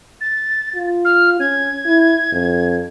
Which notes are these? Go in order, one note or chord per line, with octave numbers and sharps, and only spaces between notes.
A6
F4
F6
C#4 G#6
E4
F2